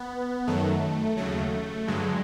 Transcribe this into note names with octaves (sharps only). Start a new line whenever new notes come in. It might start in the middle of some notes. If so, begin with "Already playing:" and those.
Already playing: B3
F#2 D#3 F#3 A3
D#2 C#3 F#3 A3
G2 D3 F#3 G#3